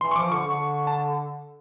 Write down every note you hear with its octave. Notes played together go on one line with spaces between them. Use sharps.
E3 C6
C#6
F3 D6
D3 C#6
D3
A5